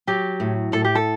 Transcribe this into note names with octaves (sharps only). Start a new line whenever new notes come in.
F#3 G4
A2
A2 A4
G4
A4